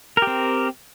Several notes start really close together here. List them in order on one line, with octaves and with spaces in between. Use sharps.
A#4 G4 C4